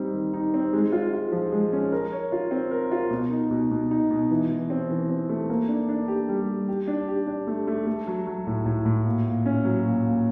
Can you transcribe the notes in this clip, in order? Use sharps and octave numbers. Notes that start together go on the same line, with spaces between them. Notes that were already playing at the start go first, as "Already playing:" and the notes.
Already playing: G3 C4 D#4
D#3
D#4
C4
G#3
F4
F4
F3
G#3
C#4
A#4
C#5
F4
C4
A#4
F4
B2
D#4
B2
B2
D#4
B2
E3
E3
C4
E3
C4
A3
A#3
D4
D4
G4
G3
G3
G4
D4
G4
D4
A3
A3
A3
F#3
F#3
A2
A2
A2
A#2
A#2
C#4
F#3
A#2
A#2